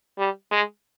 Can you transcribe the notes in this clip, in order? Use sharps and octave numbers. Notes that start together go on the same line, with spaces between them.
G3
G#3